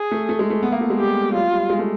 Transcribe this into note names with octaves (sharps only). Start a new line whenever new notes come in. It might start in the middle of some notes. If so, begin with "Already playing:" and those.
Already playing: G#4
A3
A3
G#3
A3
B3
A#3
A3
G#3
G3 G4
G3
F#3 F4
G3
G#3
A3